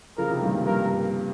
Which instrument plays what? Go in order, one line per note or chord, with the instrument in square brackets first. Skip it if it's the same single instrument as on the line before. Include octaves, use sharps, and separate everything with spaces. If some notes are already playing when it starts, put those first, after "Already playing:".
[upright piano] C#3 F3 [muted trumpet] A#4
[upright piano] C3 D#3
G2 A#2
[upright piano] G2 [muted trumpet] A#4